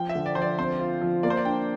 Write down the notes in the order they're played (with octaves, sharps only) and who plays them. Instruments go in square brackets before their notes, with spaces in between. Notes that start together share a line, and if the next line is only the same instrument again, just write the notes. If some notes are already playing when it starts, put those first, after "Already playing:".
Already playing: [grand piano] F3 [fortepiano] G5
[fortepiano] E5
[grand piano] D3
[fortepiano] D5
[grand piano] F3 [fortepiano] C5
[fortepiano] D5
[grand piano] C4 [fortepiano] C5
[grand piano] F4
F3
[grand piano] A#3 [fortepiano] D5
[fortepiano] C5
D5
[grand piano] D4 [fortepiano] G5